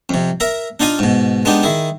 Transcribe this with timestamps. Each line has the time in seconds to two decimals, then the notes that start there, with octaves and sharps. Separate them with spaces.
0.09 F2 C3
0.40 A#4 E5 A#5
0.80 D4 D#4 F4 F5 G#5
0.99 G#2 B2
1.45 G#3 B3 D4 D#4 G4
1.63 D#3 E4 G#4